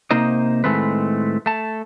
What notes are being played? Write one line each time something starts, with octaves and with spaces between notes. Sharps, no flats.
C3 A#3 D#4 C5 D#5
A2 D#3 G#3 A3 C4 B4
A3 A5